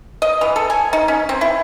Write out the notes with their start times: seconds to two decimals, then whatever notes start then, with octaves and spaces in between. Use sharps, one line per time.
0.22 D#5
0.41 E3
0.56 A4
0.70 G#5
0.93 D#4
1.08 C#4
1.29 C4
1.41 E4